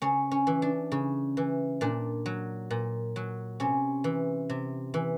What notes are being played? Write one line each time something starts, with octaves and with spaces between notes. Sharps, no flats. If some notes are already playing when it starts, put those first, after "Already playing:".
C#3 C#4
C#4
E3
D4
C#3
E3
A#2 D4
F#3
A#2
F#3
C3 C#4
E3
C3
E3